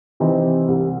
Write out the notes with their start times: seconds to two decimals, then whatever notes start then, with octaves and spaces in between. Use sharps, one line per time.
0.20 C3 E3 C4 D#4
0.68 C2